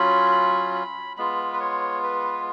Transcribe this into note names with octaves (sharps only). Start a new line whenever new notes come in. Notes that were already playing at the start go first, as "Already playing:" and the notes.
Already playing: F#3 C#4 F4 B5
B5
B5
G#3 B3 F4 B5
B4
C#5
B4